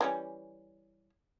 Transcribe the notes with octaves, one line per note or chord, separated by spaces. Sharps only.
E3 G3 C#4